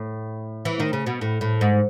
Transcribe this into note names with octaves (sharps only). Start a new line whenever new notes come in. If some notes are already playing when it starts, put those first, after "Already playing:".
Already playing: A2
E3
D#3
C#3
B2
A2
A2
G#2